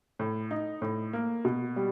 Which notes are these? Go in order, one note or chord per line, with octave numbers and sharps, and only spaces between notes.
A2
D#4
A2
A#3
B2
G3